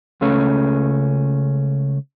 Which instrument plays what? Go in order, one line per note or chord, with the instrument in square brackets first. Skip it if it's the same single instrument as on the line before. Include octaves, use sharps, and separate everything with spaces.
[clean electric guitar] C#2 C#3 A3 C#4